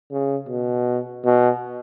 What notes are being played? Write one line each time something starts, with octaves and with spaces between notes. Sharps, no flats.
C#3
B2
B2